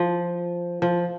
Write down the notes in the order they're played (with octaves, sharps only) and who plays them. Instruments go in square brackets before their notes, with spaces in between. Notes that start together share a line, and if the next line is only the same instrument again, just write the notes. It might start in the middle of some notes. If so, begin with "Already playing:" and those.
Already playing: [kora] F3
F3